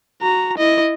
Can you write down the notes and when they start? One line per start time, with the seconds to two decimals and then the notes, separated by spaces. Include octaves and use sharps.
0.22 F#4 A#5
0.58 E4 D#5